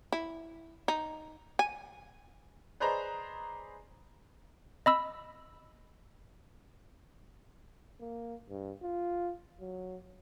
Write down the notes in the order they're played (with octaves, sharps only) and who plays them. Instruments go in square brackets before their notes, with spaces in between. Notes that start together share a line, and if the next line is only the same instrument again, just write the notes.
[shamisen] E4
D#4
G#5
[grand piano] G#4 B4 C5 D5 D#5 A#5
[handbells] D#5 B5 E6
[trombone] A#3
G2
F4
F#3